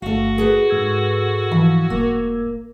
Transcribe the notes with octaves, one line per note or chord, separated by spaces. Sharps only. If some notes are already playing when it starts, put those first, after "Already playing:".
G1 A3 F#4 A4 F5
G#4 A4 B4
G#2 E6 G#6
E3 F3
E1 A#3